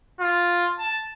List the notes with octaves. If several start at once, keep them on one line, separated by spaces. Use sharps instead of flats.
F4
A5